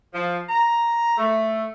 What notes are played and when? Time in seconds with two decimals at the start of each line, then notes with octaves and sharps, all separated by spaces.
0.14 F3
0.49 A#5
1.18 A3